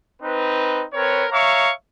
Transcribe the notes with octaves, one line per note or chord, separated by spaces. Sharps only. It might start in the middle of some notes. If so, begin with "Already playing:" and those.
C4 D#4 B4
C4 A#4 B4 C#5
C#5 E5 F5 A#5 C#6